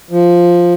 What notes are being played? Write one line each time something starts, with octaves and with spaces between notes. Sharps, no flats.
F3